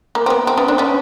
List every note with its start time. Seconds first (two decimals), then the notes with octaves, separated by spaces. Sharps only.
0.15 A#3
0.26 C4
0.30 B3
0.47 C4
0.58 B3 C#4
0.68 C4 D4
0.78 B3 C#4